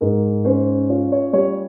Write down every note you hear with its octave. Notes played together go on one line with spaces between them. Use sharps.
G#2 A#4
C#4 C5
F4 C#5
C#5
G3 C#5